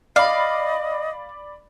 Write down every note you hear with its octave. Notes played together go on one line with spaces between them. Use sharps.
D5 D#5 F5 B5